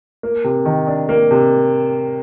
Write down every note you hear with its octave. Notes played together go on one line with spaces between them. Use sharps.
A#3
C3
D#3
D4
A#3
C3